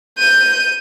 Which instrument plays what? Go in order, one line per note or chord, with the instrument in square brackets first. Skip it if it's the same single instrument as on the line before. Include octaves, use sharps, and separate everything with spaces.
[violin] G6 D#7